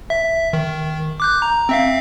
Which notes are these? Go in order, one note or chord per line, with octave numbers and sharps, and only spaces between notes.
E5
D#3
D6 F#6 G6
A#5
C4 E5 F5